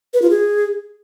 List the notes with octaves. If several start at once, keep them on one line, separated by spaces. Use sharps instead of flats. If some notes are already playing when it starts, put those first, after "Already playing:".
B4
F4
G#4